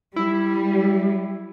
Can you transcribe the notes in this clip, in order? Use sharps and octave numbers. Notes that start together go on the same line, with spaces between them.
G3 E4